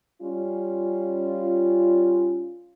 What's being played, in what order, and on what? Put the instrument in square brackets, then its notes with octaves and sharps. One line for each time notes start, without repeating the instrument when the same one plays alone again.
[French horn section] G3 C#4 F4